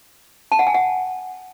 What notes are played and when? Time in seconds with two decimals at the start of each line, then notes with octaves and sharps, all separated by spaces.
0.52 A5
0.59 F#5
0.67 G#5
0.74 F#5